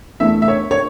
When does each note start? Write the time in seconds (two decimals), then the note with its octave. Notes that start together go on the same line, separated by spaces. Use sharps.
0.20 E2 E3 A3 E5
0.42 E5
0.48 C#5
0.71 C#5